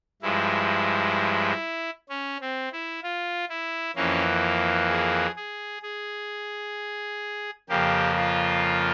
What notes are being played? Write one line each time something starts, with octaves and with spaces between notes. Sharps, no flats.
G2 F3 G#3 E4
C#4
C4
E4
F4
E4
F2 E3 A#3 C#4
G#4
G#4
G#4
F2 C#3 F3 A#3 G4
F4